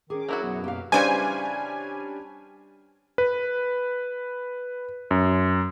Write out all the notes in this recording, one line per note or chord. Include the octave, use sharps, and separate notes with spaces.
D#3 C#4 G#4 D6
F#3 E4 F#4 A#4
F#2 B2 B3
A#3 G4 F5
C#3 E3 G3 C#4 D4 C5 G#5
B4
F#2